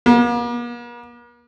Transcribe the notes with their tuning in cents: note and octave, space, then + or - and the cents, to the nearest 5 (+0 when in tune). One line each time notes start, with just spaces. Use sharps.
A#3 +45